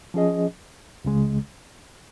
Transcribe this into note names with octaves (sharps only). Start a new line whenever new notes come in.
F3 C#4 G#4 D#5
C#2 C#3 G#3